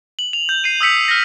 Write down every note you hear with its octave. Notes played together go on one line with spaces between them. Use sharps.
F#7
F7
G6
C7 D#7
D#6 E6 G6 B6 C#7 F7
F6 A#6